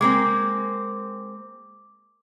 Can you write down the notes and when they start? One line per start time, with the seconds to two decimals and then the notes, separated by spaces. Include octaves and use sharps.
0.01 G#3 A#3 C4 D6